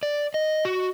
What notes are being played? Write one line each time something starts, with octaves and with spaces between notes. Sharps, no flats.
D5
D#5
F#4